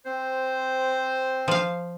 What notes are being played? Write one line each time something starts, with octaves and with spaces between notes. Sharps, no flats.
C4 C5
F3 F5